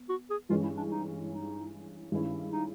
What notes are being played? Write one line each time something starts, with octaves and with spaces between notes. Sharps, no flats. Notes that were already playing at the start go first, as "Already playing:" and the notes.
Already playing: B3
F#4
G#4
G2 E3 G#3 C#4 F4
E4
D4
D#4
D#4
G2 D#3 G#3 C#4 E4
D#4